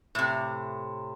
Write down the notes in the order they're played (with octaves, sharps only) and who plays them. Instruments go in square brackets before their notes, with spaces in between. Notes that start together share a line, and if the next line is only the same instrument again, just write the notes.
[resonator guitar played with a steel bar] A2 C3